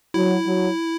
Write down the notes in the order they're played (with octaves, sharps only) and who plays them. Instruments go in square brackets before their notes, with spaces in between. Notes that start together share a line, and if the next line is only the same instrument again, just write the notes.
[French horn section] F#3 [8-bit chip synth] E4
[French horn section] F#3